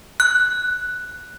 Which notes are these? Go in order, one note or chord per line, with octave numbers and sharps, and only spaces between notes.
F#6